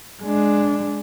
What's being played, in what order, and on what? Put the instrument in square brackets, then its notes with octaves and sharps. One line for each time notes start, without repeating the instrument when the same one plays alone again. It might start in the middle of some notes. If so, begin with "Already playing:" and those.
[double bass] G#3 D4